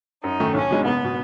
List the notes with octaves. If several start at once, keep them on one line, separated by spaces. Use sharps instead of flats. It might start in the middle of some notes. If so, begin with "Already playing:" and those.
F#2 D#4
D#3 A3 C#4
B1 C#4
B2 G#3 D#4
F#1 B3
B2